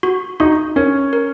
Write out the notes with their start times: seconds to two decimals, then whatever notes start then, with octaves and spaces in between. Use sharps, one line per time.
0.03 F#4
0.40 D#4 F#4
0.76 C#4 A#4
1.13 A#4